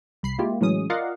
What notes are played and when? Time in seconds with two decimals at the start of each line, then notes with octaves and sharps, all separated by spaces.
0.23 C2 B5 C7
0.38 G#3 A#3 E4 F4 G4
0.61 A2 E3 F#3 G#3 C#4 D#6
0.90 F4 A#4 D5 D#5 F5 F#5